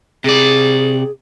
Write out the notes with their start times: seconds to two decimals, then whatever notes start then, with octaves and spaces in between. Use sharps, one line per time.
0.24 C3 G#4 D5